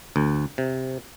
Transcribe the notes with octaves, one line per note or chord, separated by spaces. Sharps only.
D2
C3